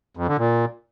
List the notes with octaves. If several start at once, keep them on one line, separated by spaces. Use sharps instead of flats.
F2
D3
A#2